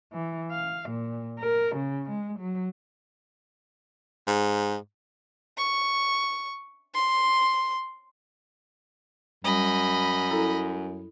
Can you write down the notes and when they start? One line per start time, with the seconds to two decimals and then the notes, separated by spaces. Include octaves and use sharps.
0.13 E3
0.51 F5
0.89 A#2
1.39 A#4
1.76 C#3
2.10 G#3
2.39 F#3
4.27 G#2
5.57 C#6
6.94 C6
9.44 F#2 G3 D#5 B5
10.31 E4 A4 A#5